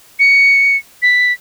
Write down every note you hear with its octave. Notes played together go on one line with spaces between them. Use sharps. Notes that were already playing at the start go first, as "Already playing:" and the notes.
C#7
B6